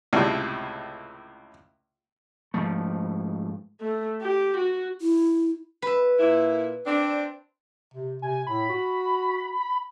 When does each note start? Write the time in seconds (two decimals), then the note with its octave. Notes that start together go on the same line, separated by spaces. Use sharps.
0.13 C#2 A2 C3
2.54 G#2 F3 A3
3.81 A3
4.22 G4
4.57 F#4
5.01 E4
5.82 B4 E5
6.19 A#2 E4
6.86 C4 D4
7.94 C3
8.22 C3 G#5
8.47 A2 B5
8.70 F#4